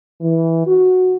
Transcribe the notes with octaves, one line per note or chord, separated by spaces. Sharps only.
E3
F#4